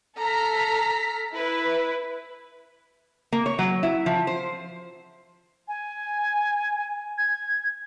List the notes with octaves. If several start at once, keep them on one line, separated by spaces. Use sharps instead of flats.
A4 A#5 F6 B6
E4 B4
A#3
C#5
F#3
E4
F3
C5
G#5
G#6